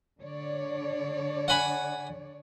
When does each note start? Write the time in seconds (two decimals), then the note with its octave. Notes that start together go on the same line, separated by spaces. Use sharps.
0.20 D3 C#5 D5
1.48 F#5 G#5 B5